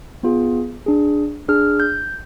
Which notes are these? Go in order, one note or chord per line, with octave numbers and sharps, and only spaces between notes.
B3 F4 G#4
D4 G#4
D4 G#4 F6
G6